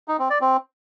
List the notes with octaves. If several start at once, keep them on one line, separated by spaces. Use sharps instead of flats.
D#4
C4
D5
C4